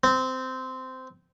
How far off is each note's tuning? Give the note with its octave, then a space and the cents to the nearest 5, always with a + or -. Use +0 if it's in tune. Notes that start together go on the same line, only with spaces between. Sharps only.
C4 -15